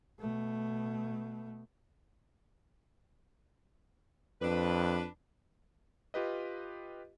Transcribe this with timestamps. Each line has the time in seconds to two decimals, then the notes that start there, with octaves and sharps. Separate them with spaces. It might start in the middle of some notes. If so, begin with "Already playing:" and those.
0.20 B2 A3
4.42 F2 D4 B4
6.14 F4 G4 B4 D#5